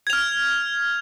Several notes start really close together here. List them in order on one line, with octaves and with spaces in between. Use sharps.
G#6 F7 F6